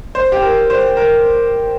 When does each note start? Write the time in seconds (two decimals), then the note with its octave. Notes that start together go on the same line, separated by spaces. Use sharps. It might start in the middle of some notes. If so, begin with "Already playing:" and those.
0.15 C5
0.32 G4
0.42 A#4
0.70 C5
0.97 A#4